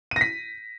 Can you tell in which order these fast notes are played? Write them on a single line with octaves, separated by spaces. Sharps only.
D#7 A#6 B6